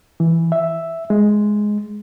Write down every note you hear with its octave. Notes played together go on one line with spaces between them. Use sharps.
E3
E5
G#3